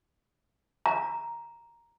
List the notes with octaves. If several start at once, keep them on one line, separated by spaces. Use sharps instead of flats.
A#5